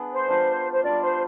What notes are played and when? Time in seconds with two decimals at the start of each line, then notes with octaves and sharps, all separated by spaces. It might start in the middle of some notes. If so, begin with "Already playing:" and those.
Already playing: B3 D4 G#4
0.13 C5
0.28 G3 D4 F4
0.72 C5
0.83 G3 D4 F4 D5
1.02 C5